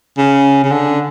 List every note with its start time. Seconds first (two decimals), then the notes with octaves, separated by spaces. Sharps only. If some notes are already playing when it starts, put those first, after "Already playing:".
0.18 C#3
0.64 C#3
0.71 D3